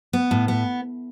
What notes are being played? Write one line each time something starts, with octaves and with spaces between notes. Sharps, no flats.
B3
A2
B3